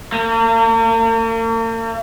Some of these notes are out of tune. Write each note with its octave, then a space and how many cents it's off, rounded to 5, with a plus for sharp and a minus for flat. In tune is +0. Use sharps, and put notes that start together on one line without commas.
A#3 -45